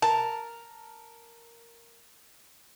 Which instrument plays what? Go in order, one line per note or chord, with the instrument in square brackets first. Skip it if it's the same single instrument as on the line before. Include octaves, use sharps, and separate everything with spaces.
[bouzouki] A#4 [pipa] A5